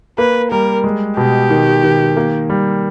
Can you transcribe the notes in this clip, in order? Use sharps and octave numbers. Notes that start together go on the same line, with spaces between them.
A#3 B4
G3 A#4
G#3
B2 G4
D#3
D#3
A#3
G3